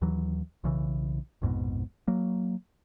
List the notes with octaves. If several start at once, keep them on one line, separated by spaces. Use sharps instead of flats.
D#2 E3 F#3
B1 C#3 E3
A#1 F2 G#2 B2
F#3 A#3